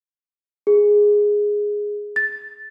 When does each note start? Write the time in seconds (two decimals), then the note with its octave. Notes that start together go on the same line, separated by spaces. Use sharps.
0.67 G#4
2.16 A6